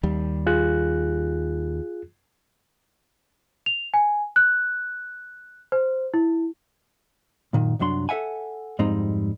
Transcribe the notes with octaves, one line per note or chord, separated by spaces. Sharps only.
D#2 G3
F4 G#4 F#6
F7
G#5
F#6
C5
E4
F#2 A#2 D#3
C2 F#2 F#3 D4 C6
A4 A#4 E5 F#5 G#5
F2 G#2 G3 G#3 C4 D#4